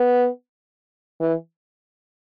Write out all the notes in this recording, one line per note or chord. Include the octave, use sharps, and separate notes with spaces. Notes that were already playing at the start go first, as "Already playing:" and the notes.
Already playing: B3
E3